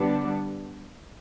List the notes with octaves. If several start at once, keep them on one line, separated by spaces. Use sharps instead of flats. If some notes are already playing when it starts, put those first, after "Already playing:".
Already playing: D3 G3 B3 D4